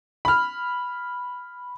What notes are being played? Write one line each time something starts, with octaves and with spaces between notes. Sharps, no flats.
B5 F6